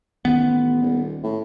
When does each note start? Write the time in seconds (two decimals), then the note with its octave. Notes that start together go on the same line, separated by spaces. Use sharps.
0.25 A1 D#3 B3
0.81 D#1
1.23 A2